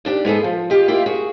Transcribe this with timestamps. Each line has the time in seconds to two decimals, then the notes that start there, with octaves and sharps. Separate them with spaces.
0.05 D#2 D4 G4
0.25 G#2 B3 G#4 A4
0.44 F3
0.70 F4 G4 D#5
0.88 A#3 E4 F4 G4
1.06 F#4 G#4